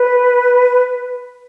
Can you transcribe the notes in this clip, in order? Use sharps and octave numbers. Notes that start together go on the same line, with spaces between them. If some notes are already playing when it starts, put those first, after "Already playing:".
Already playing: B4